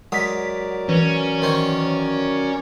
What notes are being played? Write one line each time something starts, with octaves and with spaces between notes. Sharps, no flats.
F#3 G#3 A#4 D5 F#5 D#6 B6
E3 C#4 B4
D#3 C5 C#5